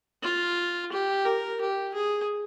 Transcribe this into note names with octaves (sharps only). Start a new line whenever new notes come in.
F4
G4
A#4
G4
G#4